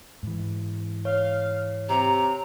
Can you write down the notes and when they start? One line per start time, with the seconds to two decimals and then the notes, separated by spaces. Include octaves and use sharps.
0.23 G#2 E3
1.05 C#5 F5
1.89 C3 A#5